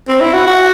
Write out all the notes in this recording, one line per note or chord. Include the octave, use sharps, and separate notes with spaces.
C4
E4
F#4
F#4